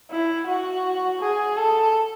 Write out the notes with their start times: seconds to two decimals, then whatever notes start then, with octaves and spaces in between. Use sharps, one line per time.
0.10 E4
0.47 F#4
1.21 G#4
1.57 A4